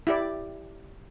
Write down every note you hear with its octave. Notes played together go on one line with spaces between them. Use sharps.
E4 G4 D5